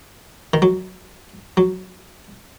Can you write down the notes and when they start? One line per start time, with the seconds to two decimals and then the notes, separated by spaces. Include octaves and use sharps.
0.53 D#3
0.62 F#3
1.57 F#3